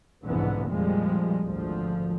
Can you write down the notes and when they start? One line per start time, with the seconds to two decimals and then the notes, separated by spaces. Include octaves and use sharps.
0.24 F1 B1 G#2 D3 E3 B3
0.70 F2 A#2 F3 G3 G#3
1.44 G#1 D2 F3